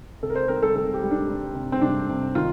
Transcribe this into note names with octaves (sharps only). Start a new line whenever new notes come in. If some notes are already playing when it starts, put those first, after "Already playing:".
C3 A4
A#4
C5
C4 A#4
A4
C3 A4
G4
G3
D4
G3
C3
C4
C3 D4
C3
D#3 F4